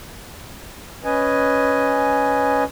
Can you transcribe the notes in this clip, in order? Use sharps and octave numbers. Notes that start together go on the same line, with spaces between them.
C#4 B4 D#5 G#5